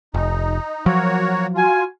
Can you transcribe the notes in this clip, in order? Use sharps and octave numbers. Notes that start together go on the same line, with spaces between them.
F1 D#4
F3 F#3 A#3 F#4 C#5
F4 F#4 G#5